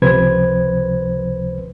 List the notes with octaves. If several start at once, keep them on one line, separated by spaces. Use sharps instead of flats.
C#2 C3 F3 B4 C5 G#6